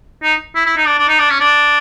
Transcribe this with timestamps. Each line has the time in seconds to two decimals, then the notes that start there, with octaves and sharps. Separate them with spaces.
0.23 D#4
0.55 E4
0.66 E4
0.77 D#4
0.87 D4
0.98 D4
1.08 D#4
1.19 D4
1.30 C#4
1.40 D4